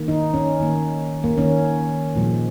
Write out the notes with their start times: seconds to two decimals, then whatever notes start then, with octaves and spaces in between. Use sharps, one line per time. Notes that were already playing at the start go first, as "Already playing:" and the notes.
Already playing: D#3 A#3
0.08 D#4
0.34 C#4
0.60 D#3 A#3
1.24 A#3
1.37 D#3 A#3 C#4
2.15 A#2 F3 G#3